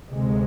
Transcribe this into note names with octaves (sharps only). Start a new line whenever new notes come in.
D2 C3 G#3